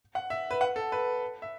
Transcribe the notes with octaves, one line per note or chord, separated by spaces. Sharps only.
F#5
E5
B4
F#5
A4
B4
E5